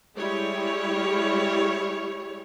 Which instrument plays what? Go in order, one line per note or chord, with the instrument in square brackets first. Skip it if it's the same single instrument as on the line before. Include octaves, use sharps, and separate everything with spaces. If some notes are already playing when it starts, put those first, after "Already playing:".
[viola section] G3 G#3 E4 G4 G#4 C#5